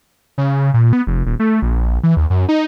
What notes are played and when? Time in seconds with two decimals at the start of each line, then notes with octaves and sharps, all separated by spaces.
0.38 C#3
0.74 A#2
0.93 B3
1.07 F1
1.26 D#1
1.40 A3
1.62 A#1
2.03 E3
2.17 D#2
2.30 F#2
2.49 D#4